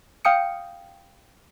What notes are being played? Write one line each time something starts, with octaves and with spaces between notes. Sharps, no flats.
F5 G5 D#6 C#7